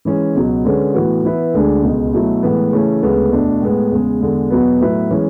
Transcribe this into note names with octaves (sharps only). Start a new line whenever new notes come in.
E3 G#3 C#4
C#2 B2 F#3
D3 G#3 C#4 G#4 B4
A2 E3 B3 F#4
E3 B3 E4 B4
D2 D3 G#3 D4 G#4
C#2 B2 G#3
B2 F#3 A3 E4
A2 E3 G#3 B3
C#3 E3 A3 C#4
D2 C#3 G#3 B3
E2 B2 A3 D4
A2 G#3 B3
E2 C#3 G#3
E2 D3 G#3
E2 B2 F#3 B3
A2 F#3 B3 E4 B4
E3 G#3 C#4